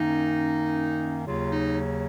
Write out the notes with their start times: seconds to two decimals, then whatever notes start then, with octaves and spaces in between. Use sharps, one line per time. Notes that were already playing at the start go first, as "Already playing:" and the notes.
Already playing: F#2 D#3 A#3 C#4 D#4
1.26 D#2 C#3 F#3 F4
1.51 D#4